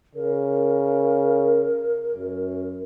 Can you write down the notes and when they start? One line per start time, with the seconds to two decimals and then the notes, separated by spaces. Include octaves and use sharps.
0.15 C#3 A#4
2.15 F#2